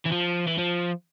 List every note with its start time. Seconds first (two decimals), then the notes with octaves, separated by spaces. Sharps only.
0.06 E3
0.12 F3
0.48 E3
0.59 F3